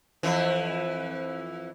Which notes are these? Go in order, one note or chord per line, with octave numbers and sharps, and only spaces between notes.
F2 E3